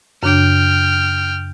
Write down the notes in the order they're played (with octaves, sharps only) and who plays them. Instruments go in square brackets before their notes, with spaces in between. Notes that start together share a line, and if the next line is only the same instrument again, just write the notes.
[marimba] F#2 C#3 D4 [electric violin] G5 F6